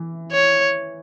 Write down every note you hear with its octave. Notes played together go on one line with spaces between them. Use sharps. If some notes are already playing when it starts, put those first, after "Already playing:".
Already playing: E3
C#5